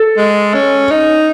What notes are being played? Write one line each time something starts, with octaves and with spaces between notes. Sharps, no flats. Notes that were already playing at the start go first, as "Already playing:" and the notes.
Already playing: A4
G#3
C#4
D#4